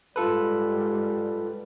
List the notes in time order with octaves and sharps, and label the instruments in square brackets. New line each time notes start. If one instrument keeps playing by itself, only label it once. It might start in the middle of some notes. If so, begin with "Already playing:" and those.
[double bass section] G#2 G3 [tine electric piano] F4 A4 B4